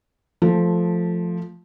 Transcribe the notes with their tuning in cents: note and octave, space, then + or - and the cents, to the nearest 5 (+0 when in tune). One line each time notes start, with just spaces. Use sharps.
F3 +0 A3 +0